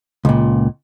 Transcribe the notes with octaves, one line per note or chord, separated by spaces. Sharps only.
C#2 A#2